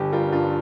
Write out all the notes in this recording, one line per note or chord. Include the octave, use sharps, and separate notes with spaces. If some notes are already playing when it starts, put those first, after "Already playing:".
Already playing: G1 G4
G3 F4 A#4
G2 F4